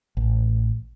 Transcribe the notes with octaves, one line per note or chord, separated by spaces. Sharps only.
A1